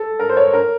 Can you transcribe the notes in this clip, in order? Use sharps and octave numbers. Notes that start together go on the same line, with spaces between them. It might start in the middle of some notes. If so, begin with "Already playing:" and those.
Already playing: A4
A#4
C5
C#5
A#4